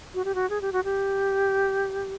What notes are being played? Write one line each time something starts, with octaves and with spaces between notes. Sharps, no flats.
F#4
G4
F#4
G#4
G4
F#4
G4